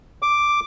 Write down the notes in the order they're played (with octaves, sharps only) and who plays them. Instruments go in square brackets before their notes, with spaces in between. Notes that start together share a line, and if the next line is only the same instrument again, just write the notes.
[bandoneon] D6